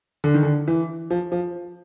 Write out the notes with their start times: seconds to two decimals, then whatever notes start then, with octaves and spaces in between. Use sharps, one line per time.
0.24 D3
0.34 D#3
0.43 D3
0.68 E3
1.10 F3
1.32 F3